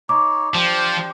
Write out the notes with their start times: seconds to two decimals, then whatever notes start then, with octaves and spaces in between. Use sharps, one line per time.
0.09 D#4 C#5 D6
0.54 F3 D4 G4 C5